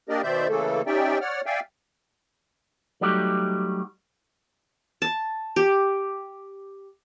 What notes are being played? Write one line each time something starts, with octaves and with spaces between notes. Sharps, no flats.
A#3 D4 G4 A#4 D5 D#5
B2 D#3 C5 D5 E5 G6
C#3 E3 A3 A#3 A4
C#4 D#4 G4 D5 E5 G5
C#5 D5 F#5 F6
D5 E5 F5 G5 G#5
F#3 G3 A3 D#4 F#4 G4
A5
G4